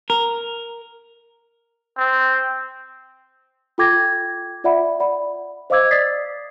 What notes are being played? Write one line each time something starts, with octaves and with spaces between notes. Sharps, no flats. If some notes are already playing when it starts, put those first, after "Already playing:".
A#4
C4
F4 A4 G5 D6 G#6 A#6
F4 D5 E5 F#5 B5
D5 F#5 B5
C5 D#5 F5 D6 E6 G#6
D5 D#6 A6 B6 C7